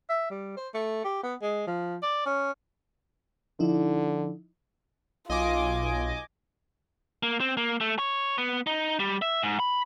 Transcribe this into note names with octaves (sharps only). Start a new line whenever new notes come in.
E5
G3
C5
A3
G4
B3
G#3
F3
D5
C#4
D3 F3 D#4 E4
B1 F4 D#5 G#5 D6
A#3
C4
A#3
A3
C#5
B3
D#4
G3
E5
G#2
B5